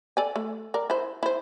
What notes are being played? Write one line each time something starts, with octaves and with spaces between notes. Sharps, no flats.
A4 D5 G#5
A3
A#4 D5
E4 C5
E4 C5